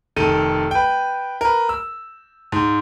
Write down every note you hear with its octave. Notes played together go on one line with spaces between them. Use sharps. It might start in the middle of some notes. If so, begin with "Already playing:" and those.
F1 D#3 A4 D#7
B4 G5
A#4 B4
E6
G#2